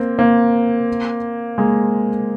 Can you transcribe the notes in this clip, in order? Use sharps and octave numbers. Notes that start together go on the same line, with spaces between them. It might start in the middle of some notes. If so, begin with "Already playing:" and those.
Already playing: A#3 C4
A#3 C4
G#3 A#3